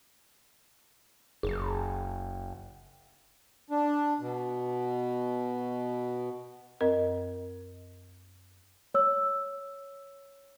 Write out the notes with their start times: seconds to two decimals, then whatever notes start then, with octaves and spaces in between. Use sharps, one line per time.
1.43 F#1 G#4
3.71 D4
4.19 B2
6.81 F#2 C4 A#4 D#5
8.94 C#5 E6